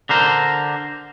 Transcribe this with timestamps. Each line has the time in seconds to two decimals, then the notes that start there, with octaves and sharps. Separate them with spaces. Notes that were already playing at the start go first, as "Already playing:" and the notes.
0.09 D3 A#4 C5